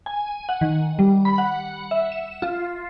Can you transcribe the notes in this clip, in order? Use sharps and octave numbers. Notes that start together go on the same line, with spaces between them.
G#5
F#5
D#3
G3
B5
F#5
E5
E7
F4